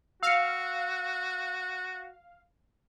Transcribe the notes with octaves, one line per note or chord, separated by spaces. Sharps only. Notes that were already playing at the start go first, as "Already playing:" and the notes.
F#4 F5 E6 C#7